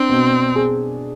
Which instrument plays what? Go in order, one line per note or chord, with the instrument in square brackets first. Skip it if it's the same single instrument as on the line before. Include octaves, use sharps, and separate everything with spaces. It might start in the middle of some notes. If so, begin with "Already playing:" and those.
Already playing: [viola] C4 [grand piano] D4
[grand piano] B2
G#4